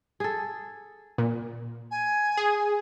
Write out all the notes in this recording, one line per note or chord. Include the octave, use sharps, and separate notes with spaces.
G#4 A4
A#2
G#5
G#4